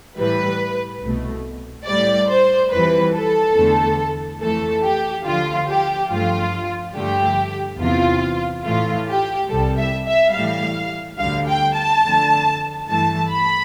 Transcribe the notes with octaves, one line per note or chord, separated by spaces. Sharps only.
A2 E3 G3 B4
C2 B2 A3
A2 G3 D5
C5
F2 E3 G3 B4
A4
E2 D3 A3
F2 E3 A3 A4
G4
D2 D3 F3 F4
G4
G2 F3 A3 F4
G2 D3 F3 A3 G4
E2 C3 E3 F4
A2 E3 A3 F4
G4
C2 C3 G3 A4
E5
E5
A2 E3 G3 F5
D2 D3 G3 F5
G5
A5
F2 D3 A3
G2 E3 A3 A5
B5